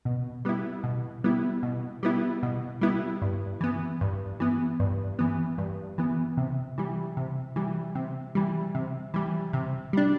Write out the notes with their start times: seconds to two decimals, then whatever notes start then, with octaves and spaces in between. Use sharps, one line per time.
0.05 B2
0.45 G3 B3 E4
0.84 B2
1.24 G3 B3 E4
1.63 B2
2.03 G3 B3 E4
2.43 B2
2.81 G3 B3 E4
3.22 G2
3.61 E3 B3
4.01 G2
4.40 E3 B3
4.80 G2
5.19 E3 B3
5.58 G2
5.98 E3 B3
6.37 C3
6.78 E3 G3
7.17 C3
7.56 E3 G3
7.95 C3
8.35 E3 G3
8.75 C3
9.14 E3 G3
9.53 C3
9.93 G3 D4